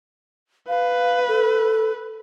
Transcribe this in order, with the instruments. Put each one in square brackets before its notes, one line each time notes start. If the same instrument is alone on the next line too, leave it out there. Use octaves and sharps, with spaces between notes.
[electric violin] B4 [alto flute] F5
[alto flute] A4